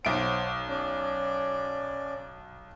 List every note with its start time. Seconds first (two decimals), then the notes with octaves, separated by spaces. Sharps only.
0.05 B1 C5 C#5 F#5 D7
0.68 C#4 D5